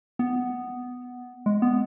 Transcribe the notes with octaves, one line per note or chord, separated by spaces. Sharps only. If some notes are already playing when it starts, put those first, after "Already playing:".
B3
G#3
B3